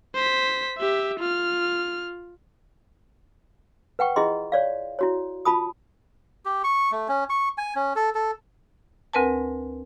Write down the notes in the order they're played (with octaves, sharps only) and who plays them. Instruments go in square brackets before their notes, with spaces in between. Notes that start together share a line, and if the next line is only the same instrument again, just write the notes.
[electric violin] C5 B6
G4 E5
F4 F6
[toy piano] B4 F#5 G5 C#6
E4 F4 G#4 D#5 C6
C#5 D5 F5
E4 F#4 C#5
F4 A5 B5 D#6
[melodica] G4
C#6
A3
C#4
C#6
G#5
C#4
A4
A4
[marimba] D2 C4 A#4 B4 G#5 A5